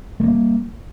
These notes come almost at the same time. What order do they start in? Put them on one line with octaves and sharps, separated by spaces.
A3 A#3 G3